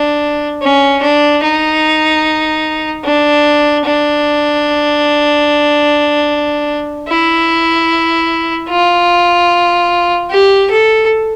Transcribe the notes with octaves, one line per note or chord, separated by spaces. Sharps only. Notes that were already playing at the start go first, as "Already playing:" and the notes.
Already playing: D4
C#4
D4
D#4
D4
D4
E4
F4
G4
A4